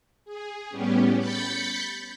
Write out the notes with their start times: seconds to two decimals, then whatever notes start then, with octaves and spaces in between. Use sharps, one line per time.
0.25 G#4
0.69 A2 G3 B3 C#4 G4
1.18 B5 G6 A6 B6 C#7